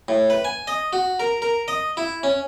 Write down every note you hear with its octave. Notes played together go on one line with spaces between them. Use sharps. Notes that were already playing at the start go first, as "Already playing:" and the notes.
A2
B4
G#5
D#5
F#4
A#4
A#4
D#5
E4
C#4